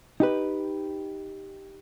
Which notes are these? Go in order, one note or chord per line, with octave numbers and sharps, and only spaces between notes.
D#4 G4 B4